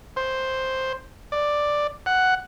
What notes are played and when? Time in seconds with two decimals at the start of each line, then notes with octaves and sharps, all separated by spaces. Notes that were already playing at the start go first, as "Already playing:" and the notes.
0.16 C5
1.32 D5
2.06 F#5